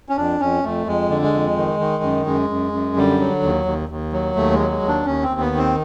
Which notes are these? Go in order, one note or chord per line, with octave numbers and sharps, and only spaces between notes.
C#4
F2 D4
F2 C#4
F2 A3
F2 G#3
D3
G#3
F2
D#3
D#3
F#2
F#2 G#3
F#2
F#2
D3 G3
F#3
D#2
D#2
D#2
F#3
D#2 A3
G#3
F#3
G#3
D#2
D4
D#2 C#4
C4
D#2
B3
D#3
C4